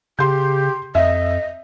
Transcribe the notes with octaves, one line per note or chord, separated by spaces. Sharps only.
C#3 G4 C6 G6
F2 D#5 E5